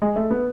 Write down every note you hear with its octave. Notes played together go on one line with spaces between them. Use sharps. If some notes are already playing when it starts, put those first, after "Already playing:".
G#3
A3
B3